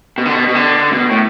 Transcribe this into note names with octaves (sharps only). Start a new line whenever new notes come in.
B2
D3
B2
B2
D3
B2
A2